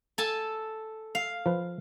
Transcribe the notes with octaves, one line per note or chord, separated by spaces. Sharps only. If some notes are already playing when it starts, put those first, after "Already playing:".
A4 G#5 A5
F5
F3 B4